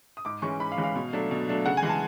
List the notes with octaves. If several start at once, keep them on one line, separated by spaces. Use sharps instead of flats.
D#6
G#2 D6
E3 G#3 C#4 C#6
G#2 B5
F5
E3 G#3 C#4
F5
B2
F#3 A3 D4
B2
F#3 A3 D4
C#3 F#5
G#5
E3 G#3
A5